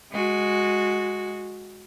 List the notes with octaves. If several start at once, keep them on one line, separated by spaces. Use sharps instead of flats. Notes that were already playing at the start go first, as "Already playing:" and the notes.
G#3 F#4